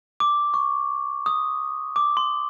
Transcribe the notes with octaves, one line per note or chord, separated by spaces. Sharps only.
D6
C#6
D#6
D6
C6